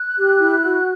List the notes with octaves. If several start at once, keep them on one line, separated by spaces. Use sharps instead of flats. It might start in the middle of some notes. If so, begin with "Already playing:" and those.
Already playing: F#6
G4
E4
F#4